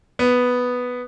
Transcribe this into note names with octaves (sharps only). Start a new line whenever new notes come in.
B3